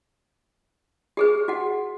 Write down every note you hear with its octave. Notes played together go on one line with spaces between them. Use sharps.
G4 G#4 B4
F#4 F#5